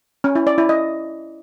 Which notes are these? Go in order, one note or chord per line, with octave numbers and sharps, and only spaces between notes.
C#4
E4
D5
E4
D#5